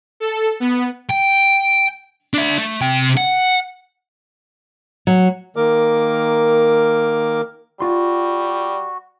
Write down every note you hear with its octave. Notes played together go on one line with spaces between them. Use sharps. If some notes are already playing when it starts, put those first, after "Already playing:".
A4
B3
G5
D4 E5
A3
C3 G5
F#5
F#3
D#3 A#3 A#4 D6
G3 F4 F#4 C6